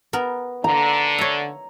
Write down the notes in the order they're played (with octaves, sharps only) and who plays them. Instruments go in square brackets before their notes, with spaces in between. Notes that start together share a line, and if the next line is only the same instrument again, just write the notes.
[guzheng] B3 A#4
[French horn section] D3 [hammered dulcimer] A#5
[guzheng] C#5 E5